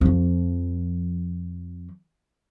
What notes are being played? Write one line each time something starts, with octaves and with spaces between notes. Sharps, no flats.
F2 F3